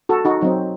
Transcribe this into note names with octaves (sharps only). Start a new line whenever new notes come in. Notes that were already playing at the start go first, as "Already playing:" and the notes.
F#4 A4
D#4 F#4
F#3 C4 D#4